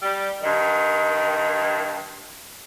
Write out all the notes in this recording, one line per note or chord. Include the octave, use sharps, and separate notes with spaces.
G3
G2 D#3